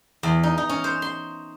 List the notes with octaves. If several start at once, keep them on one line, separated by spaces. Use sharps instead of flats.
E2
D#4
D#4
C#4
C5
C6